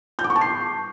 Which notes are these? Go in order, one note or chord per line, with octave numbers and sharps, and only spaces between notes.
G6
D6
C#6
A5
C7